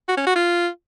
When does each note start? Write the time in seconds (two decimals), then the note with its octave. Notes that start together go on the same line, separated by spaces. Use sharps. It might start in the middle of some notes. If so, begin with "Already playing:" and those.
0.08 F#4
0.17 C#4
0.26 F#4
0.35 F4